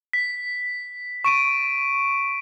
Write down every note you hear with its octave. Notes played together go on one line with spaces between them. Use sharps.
B6
C#6 D7 D#7